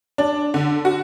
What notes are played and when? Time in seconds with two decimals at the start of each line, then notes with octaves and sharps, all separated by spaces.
0.18 D4
0.54 D3
0.85 F#4